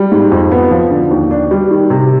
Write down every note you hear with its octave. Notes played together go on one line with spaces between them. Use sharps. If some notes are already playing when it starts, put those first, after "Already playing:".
Already playing: G3
G#2
F2
B3
F3
D3
D#2
D4
G3
D#3
C3